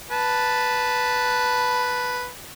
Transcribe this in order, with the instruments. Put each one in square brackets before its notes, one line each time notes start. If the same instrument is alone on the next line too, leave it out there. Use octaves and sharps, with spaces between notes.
[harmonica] B4 A5